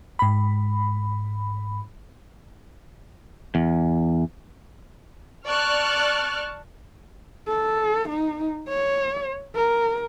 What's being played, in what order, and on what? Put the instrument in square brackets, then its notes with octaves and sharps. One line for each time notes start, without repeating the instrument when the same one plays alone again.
[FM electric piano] G#2 B5
[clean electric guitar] E2
[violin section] D5 A5 C#6 F6 F#6
[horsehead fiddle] A4
D#4
C#5
A#4